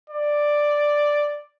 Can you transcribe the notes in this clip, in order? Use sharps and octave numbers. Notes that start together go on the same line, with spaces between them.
D5